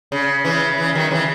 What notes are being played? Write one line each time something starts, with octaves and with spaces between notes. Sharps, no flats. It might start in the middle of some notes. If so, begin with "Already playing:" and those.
C#3
C#3 E3
C#3 E3
D#3 F#3
C#3 E3